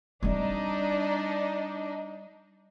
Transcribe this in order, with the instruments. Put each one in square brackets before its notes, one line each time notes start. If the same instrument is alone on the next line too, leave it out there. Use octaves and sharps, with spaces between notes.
[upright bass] G3 C4 [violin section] D4 D#4